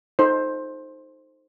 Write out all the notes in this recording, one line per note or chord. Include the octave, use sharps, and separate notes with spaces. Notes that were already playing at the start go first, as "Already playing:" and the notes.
D#4 A4 C5